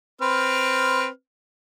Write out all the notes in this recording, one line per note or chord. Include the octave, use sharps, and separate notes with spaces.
C4 B4 F6